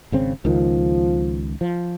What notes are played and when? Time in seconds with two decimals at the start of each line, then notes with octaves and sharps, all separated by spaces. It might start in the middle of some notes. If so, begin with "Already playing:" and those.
0.12 G#1 C#3 C4
0.45 C#2 D#3 F3
1.61 F3